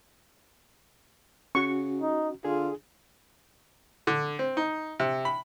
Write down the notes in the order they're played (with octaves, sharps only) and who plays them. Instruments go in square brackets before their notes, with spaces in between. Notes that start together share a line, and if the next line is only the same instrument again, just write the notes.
[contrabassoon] C#3 [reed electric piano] C#4 F#4 [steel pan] C#6
[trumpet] D#4
[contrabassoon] D3 [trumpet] F4 [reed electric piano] G#4
[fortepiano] D3
C4
D#4
C3
B5